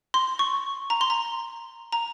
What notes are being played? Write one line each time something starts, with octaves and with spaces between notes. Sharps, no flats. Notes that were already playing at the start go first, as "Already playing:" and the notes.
C6
C#6
A#5
C6
A#5
A#5